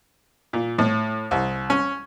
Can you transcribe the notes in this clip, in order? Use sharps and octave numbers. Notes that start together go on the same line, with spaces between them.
A#2
A2
C2
C#4